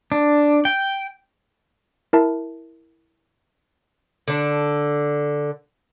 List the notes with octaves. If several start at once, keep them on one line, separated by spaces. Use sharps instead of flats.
D4
G5
E4 A#4 E5 A5
D3 D4